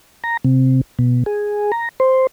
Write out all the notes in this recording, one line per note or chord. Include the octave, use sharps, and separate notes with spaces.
A#5
C3
B2
G#4
A#5
C5